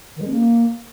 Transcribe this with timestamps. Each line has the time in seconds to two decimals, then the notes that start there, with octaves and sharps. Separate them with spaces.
0.16 D#3
0.21 G#3
0.26 C#4
0.31 A#3